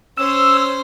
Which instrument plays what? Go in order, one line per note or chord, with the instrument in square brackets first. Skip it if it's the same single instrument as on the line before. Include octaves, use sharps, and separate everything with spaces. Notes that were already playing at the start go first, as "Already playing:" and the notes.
[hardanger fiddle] C#4 C5 [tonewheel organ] E6